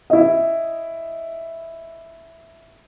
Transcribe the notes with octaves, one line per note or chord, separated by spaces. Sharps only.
E4 D#5